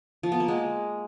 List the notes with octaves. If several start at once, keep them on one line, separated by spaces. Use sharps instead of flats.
F3
B3
A#3
G#3